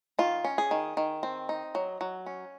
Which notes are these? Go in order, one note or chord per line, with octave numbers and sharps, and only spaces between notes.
D#3 F4
C#4
G#4
D#3
D#3
C4
D#4
F#3
F#3
C#4